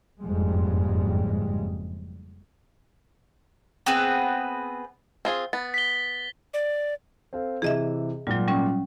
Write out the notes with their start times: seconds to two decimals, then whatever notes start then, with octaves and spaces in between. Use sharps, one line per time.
0.21 F#1 F2 G#2 G3 G#3
3.86 B3 C4 G#4 B4
5.25 C4 F4 G#4
5.53 B3 A6
5.74 B6 G7
6.54 D5
7.33 C4 A4 F5
7.62 C3 E3 G#4 D#5 E5
8.27 G#1 A#2 F#3 G3
8.48 G3 C#4